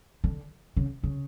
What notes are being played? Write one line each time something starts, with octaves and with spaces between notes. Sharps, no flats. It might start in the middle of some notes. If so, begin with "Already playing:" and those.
D3
C#3
C#3